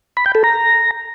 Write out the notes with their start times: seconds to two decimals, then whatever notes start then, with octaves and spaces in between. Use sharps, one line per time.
0.17 B5
0.26 G5
0.35 A4
0.44 A#5